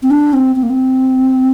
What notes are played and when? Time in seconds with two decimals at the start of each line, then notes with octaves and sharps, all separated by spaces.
0.03 C4
0.11 D4
0.33 C4
0.56 C4
0.63 A#3
0.70 C4